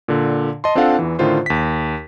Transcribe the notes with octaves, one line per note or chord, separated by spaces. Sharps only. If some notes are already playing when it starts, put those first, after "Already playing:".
A#2 D3
D#5 A5 C6
C4 D4 F4 A4 F5 F#5
E2 E3
A2 D3 D#3 F4 C5
D#2 B6